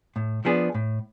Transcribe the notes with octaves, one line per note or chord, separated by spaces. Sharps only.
A2
F3 B3 D4 G#4
A2